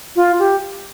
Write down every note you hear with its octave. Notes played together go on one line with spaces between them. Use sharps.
F4
G4